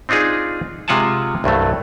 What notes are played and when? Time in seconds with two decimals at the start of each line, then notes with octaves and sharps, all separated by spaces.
0.09 C4 D4 D#4 F4 G#4
0.88 C3 G#3 F4 F#5 G#5 A5
1.44 C2 G2 F#3 A3